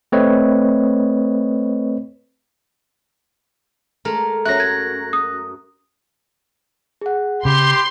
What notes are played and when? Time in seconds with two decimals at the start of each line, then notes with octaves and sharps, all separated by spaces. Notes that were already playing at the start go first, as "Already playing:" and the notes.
0.12 A3 C4 B4 C#5 D#5
4.05 G#3 A3 A#4
4.45 F#2 F#4 C#5 E5 F#6 A#6
4.60 G#6
5.13 D#6
7.01 G#4 F#5
7.45 C#3 G4 B5 C6